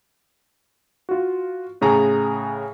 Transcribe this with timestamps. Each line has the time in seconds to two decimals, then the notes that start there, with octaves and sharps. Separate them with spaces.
1.09 F4 F#4
1.81 A2 C#3 G#4 A#5